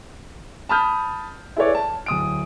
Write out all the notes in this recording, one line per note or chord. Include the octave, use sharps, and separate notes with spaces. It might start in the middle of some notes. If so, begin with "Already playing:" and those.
A5 B5 D#6 F6 G6
E4 G#4 A4 B4 C#5 D5
A5
D1 D#6 D7